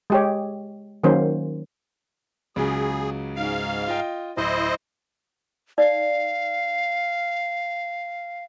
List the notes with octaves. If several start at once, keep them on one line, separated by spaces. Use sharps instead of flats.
G#3 G4 C#5
D#3 F#3 A#3 C#4 C5
C#2 C#3 F#3 G#4
G#2 F5
F4 D#5 G5
D1 E4 C5 D#5
D#4 D5 F5